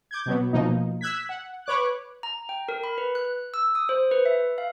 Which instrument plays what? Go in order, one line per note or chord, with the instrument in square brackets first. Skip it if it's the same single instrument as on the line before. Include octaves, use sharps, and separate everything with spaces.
[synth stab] D6 G6 G#6
B2 F#3 B3
B2 F3 A#3 D#4
E6 F#6 G#6 B6
F#5
B4 C#5 D6 F#6
[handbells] A#5
G5
A#4
B5
B4
F#6
E6
D#6
C5
B4
E5
F5